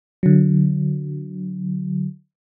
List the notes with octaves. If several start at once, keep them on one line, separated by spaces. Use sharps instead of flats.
D3 F#3